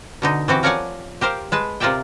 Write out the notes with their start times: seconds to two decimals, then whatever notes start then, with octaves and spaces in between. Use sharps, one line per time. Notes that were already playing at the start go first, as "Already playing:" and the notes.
0.22 B2 D3 D#4
0.48 E3 C4 F#4 G4
0.63 F3 A#4 C#5 D5 F#5 G#5
1.21 G4 A#4 C5 F5
1.52 G#3 B4 A5
1.80 C3 F4 A#4 D5 E5 G5